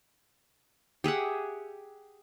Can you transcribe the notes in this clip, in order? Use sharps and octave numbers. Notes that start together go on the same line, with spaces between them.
G4 G#4 E5 F#5